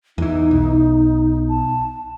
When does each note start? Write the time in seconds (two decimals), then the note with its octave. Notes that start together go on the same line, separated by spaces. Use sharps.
0.18 E2 E3 D#4
0.51 B1
1.49 A5